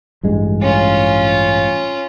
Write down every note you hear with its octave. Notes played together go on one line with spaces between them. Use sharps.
A1 G2 G#3
C#4 F4